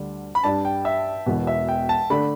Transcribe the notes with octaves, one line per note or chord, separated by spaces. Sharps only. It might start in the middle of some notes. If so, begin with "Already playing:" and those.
Already playing: D2 D3 G3 D4
B5
G2 G3 D4 A5
G5
E5
E1 E2 B2
E5
G5
A5
D3 A3 D4 B5